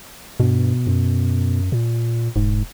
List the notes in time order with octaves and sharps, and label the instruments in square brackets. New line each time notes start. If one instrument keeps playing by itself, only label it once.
[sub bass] G2 [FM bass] B2
[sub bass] F#2
A#2
[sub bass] E1 [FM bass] G#2